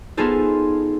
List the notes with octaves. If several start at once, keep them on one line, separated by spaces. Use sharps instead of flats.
B3 D#4 F4 G#4 A4 C5